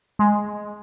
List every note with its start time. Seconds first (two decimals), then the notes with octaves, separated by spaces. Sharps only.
0.19 G#3